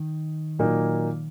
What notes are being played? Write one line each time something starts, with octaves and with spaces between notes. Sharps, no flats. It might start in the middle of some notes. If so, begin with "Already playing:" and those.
Already playing: D#3
A#2 F#3 A#3 D#4